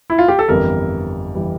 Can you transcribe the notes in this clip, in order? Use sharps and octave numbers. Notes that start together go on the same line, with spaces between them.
E4
F4
G4
A4
G1 F2 E3 G3 A#4
E3 G3